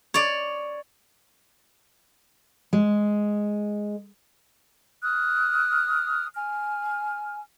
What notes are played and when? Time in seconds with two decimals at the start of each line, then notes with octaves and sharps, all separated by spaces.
0.14 C#5 D5
2.73 G#3
5.03 D#6 F6 F#6
6.35 G#5 F6